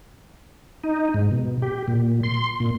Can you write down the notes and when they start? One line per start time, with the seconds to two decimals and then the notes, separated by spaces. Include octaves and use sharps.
0.84 D#4
1.14 G#2
1.31 B2
1.62 G4
1.88 A#2
2.23 C6
2.60 A#2